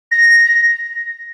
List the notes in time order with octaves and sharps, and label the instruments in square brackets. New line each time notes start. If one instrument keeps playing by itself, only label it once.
[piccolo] A#6